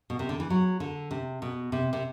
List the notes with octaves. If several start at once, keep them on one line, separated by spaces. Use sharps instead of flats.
B2
C3
D3
E3
F#3
D3
C3
B2
C3
C3